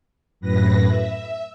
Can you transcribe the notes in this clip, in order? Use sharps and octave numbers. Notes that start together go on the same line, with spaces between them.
F#2 A2 B4 A#6
E5